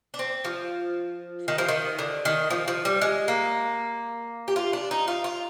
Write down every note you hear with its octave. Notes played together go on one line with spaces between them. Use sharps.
D4
C4
F3
D#3
F3
D#3
D3
D#3
F3
F3
G3
G#3
A#3
G4
F4
D4
D#4
F4
F4